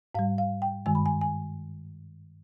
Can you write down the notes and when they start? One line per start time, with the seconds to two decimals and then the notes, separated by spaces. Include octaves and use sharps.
0.15 G#2 G3 F5
0.38 F5
0.62 G5
0.86 G2 D#3 G#3 G#5
0.95 B5
1.06 G#5
1.21 G#5